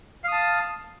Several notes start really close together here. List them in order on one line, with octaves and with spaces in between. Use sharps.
F5 D#6 A5